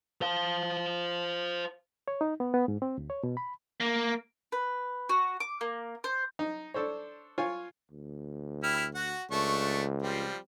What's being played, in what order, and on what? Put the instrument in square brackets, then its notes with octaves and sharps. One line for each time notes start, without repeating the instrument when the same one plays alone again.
[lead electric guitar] C5 F5
[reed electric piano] C#5
D#4
B3
B3
G#2
C4
D2
C#5
B2
B5
[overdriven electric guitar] A#3
[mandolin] B4
F#4
D6
A#3
C5
[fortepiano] D#4
D4 A4 C5 C#5
F4 C#5 G#5
[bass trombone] D2
[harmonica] E4 G4 F6
F#4 F#5
[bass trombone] C#2 [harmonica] A3 D4 C#6
[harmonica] F3 G3 C4